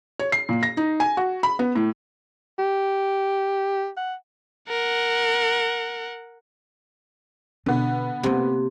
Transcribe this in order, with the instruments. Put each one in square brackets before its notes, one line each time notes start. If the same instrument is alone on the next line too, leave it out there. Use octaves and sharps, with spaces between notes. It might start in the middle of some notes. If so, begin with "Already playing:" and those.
[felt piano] C#5
C7
A#2
A#6
D#4
G#5
F#4
B5
B3
A2
[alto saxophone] G4
F#5
[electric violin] A#4 F#5
[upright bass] B2 [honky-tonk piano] D3 B3
[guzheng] C3 [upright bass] A#3 F4